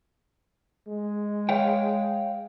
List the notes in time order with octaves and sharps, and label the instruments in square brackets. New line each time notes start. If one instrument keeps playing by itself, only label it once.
[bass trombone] G#3
[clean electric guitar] C#5 F5 G5